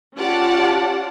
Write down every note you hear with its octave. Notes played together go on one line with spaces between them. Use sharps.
C#4 F4 G4 D5 F#5 A5